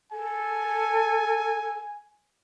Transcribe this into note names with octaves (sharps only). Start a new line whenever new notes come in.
A4 G#5